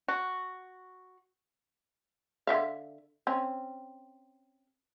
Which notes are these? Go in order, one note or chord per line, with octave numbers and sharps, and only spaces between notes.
F#4
D3 E5 F5
C4 C#4